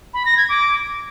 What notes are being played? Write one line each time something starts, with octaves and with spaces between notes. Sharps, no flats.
B5
A#6
G#6
D6